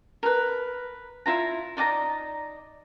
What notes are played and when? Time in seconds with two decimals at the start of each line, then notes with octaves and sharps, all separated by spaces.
0.23 A#4 B4
1.26 E4 F4 A#5
1.77 D#4 D5 F#5 A#5